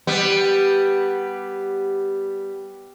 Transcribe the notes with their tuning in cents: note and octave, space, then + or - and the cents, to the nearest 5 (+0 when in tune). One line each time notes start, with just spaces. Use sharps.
G3 +0 B3 +0